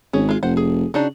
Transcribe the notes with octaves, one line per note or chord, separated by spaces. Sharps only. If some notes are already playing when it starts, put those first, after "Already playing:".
G#1 C#4 G#4
G#3 F4
F1 C5 F#5
G#4
C#3 D4 D#4 F#4